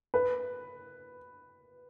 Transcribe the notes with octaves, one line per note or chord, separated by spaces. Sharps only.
B4